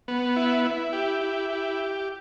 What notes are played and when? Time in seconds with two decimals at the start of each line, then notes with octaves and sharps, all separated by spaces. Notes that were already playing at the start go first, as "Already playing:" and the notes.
0.08 B3
0.36 E4
0.65 E4
0.93 G4
1.21 E4
1.50 G4